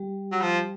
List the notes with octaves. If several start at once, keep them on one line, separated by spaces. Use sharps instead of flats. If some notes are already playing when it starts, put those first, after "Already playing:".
Already playing: G3 G4
F#3
F3